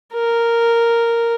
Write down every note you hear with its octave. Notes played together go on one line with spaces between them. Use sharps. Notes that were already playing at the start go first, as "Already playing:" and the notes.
A#4